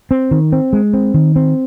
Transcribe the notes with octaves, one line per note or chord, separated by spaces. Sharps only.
C4
D#3
C4
G#3
C4
D#3
C4